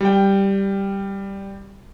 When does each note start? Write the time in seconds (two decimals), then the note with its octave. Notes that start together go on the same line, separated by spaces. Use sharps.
0.01 G3 G5